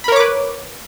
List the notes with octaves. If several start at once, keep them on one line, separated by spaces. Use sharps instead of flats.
A#4 B4 C#5 B5 D6